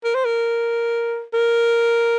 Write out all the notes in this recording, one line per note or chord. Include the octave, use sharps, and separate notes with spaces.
A#4
C5
A#4
A#4